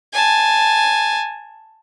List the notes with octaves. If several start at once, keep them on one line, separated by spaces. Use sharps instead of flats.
G#5 A5